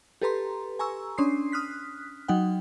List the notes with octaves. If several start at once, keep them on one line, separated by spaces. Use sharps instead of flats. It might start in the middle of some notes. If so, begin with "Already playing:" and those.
G4 A4 B4 A#5 C6
G#5 A#5 C#6 E6
C#4 D4 C6 D#6 C7
D#6 F6 F#6 B6
F#3 D#4 F#5 G5